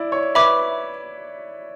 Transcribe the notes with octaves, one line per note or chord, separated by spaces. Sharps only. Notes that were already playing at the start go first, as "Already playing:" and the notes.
Already playing: E4 D5
C#5
B4 E5 B5 D6